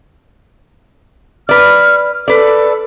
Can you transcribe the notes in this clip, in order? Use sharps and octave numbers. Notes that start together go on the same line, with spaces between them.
B4 D5 F6
A4 B4 D5